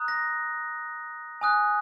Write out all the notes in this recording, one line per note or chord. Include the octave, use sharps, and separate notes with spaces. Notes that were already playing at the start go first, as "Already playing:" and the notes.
Already playing: A#5 D#6 F#6
A#6
G#5 D#6 F#6